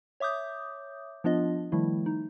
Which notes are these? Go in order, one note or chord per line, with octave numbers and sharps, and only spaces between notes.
C#5 E5 D6 D#6 G6
F3 B3 D4 F4 D#5
D#3 F3 G3 A3 E4
D#4